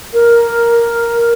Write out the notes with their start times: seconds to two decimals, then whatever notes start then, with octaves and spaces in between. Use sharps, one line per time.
0.14 A#4